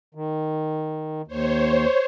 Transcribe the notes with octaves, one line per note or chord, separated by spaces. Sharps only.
D#3
D#2 C5 C#5